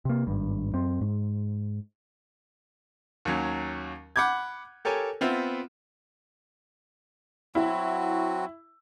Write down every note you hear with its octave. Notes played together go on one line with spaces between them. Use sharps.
C3 A#3
G#1 G2
F#2 C4
G#2
D#2 F#3 C#4
F#5 B5 D6 G6 G#6
G4 A4 A#4 C#5 G#5
B3 C4 F4 E5
F#3 C4 E4 F#4